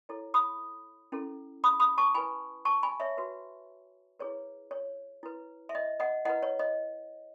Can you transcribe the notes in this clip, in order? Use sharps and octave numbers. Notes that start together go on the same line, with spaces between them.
E4 A4 C#5
B5 D#6
C#4 E4 A4
B5 D#6
B5 D#6
A5 C#6
E4 B4 G#5 B5
A5 C#6
G#5 B5
C#5 E5
F#4 B4
E4 G#4 B4 C#5
C#5
E4 B4
E5
D#5
D#5 F#5
E4 B4 D#5 F#5
C#5
D#5